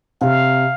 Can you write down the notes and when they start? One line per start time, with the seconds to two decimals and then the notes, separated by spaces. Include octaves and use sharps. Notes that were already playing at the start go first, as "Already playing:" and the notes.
0.21 C3 F5